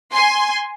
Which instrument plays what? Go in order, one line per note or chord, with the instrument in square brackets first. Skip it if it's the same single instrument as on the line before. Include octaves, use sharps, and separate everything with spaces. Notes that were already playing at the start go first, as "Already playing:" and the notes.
[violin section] G#5 C6